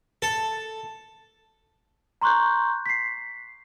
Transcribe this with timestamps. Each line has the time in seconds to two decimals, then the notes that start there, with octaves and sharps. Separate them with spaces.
0.22 A4
2.21 A#5 C6 C#6 F#6 G6
2.86 B6 C7